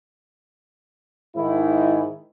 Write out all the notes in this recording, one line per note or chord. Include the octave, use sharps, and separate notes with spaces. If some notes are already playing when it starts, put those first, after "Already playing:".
G#2 D#3 E4